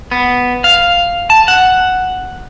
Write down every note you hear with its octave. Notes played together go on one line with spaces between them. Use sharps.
B3
F5
A5
F#5